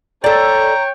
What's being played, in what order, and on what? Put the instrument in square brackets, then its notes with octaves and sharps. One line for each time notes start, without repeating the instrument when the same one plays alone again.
[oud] A4 D5 [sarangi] C#5 [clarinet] G5 [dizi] A#5